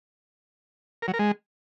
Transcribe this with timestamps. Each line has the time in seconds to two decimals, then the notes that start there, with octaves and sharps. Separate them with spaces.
1.02 A#4
1.08 F#3
1.14 A#4
1.19 G#3